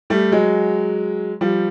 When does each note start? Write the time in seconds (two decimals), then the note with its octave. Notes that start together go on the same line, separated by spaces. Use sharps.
0.10 G3 A3
0.32 F#3 G#3
1.41 F3 G3